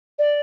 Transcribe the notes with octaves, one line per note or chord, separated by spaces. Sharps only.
D5